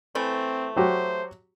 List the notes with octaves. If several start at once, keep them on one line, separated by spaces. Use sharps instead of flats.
E3 A3 C4
F#3 F#4 G4 C5